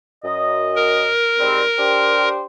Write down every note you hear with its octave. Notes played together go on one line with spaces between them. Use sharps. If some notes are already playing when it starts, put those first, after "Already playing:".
F#2 D#5
A#4
G#2 G3 C4
D4 G4 C5